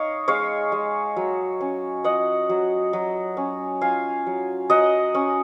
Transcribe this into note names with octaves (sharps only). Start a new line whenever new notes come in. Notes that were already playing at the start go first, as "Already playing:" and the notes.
Already playing: D#4 C#5 D#5 F5
G#3 C#5 F5
G#3
F#3
C#4
F4 D#5 F#5
F#3
F#3
C#4
F4 F5 G#5
F#3
F#3 D#5 F#5
C#4